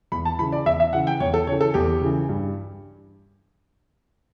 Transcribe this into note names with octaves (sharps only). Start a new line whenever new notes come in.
E2 B5
A5
C#3 E3 B5
D5
E2 E5
E5
C#3 E3 F#5
G5
E2 C#5
A4
C#3 E3 C#5
A4
E2 G4
C#3 E3
G2